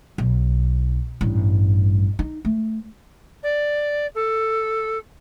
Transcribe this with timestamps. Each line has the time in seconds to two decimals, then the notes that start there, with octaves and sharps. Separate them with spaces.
0.18 B1
1.21 A1 G2
2.19 D#4
2.45 A3
3.43 D5
4.15 A4